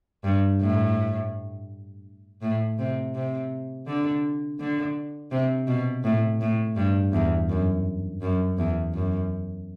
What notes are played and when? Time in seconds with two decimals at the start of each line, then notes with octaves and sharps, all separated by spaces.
0.24 G2
0.61 A2
2.42 A2
2.78 C3
3.15 C3
3.87 D3
4.60 D3
5.31 C3
5.67 B2
6.04 A2
6.41 A2
6.76 G2
7.13 E2
7.49 F#2
8.22 F#2
8.58 E2
8.94 F#2